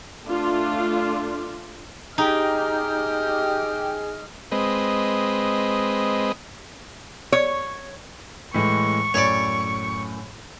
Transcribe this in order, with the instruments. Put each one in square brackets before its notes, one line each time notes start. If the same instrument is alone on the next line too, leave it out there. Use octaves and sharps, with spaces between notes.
[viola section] A3 D4 F4
[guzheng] D#4 [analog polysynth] G4 G5 [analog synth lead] G#4 [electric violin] D#5 F6
[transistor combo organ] G#3 C4 B4 D#5
[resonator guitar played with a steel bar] C#5
[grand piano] A2 E3 G#3 [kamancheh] C#6
[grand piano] F#2 A2 [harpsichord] C#5 D5